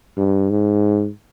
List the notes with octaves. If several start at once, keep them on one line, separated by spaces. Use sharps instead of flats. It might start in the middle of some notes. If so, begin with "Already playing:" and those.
G2
G#2